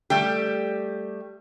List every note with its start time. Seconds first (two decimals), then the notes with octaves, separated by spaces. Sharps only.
0.10 G3 A3 G4